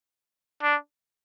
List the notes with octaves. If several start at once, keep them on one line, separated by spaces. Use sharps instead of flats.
D4